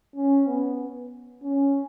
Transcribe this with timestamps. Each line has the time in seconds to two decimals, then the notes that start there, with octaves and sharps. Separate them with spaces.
0.15 C#4
0.47 B3
1.43 C#4